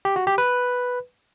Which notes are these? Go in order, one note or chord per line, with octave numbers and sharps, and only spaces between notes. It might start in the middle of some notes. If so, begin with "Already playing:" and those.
G4
F#4
G4
B4